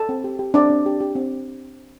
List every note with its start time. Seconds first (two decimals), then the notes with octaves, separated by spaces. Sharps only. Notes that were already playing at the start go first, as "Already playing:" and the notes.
Already playing: A4 A5
0.09 C4
0.24 G4
0.39 G4
0.54 C4 D4 D5
0.70 C4
0.86 G4
1.00 G4
1.15 C4